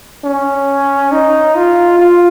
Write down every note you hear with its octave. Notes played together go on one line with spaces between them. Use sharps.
C#4
D#4
F4
F4